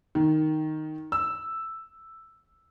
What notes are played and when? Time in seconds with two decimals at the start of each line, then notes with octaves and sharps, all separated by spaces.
0.15 D#3
1.12 E6